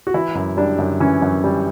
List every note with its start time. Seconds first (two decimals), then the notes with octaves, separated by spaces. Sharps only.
0.07 F#4
0.14 E3 E4
0.35 F#2
0.57 G3 D4
0.78 F#2
1.00 E3 C#4
1.22 F#2
1.44 G3